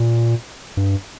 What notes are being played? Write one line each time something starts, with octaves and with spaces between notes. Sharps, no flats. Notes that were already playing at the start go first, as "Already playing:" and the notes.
Already playing: A#2
G2